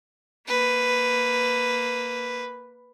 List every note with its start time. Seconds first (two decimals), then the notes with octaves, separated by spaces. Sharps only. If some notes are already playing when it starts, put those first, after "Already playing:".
0.47 A#3 B4